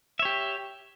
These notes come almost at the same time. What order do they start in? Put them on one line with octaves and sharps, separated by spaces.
E5 C#5 G4